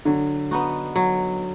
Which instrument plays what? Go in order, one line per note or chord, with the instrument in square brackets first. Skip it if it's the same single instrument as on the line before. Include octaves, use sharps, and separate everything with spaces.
[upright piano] D3 [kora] F#3
[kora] B3 D#4 F#4
F#3